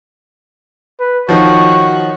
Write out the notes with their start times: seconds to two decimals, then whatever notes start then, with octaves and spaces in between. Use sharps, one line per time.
1.00 B4
1.29 D#3 F3 F#4 C#5